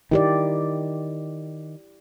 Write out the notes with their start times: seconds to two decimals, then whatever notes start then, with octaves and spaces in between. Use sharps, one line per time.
0.11 D#3 E4 G4 D5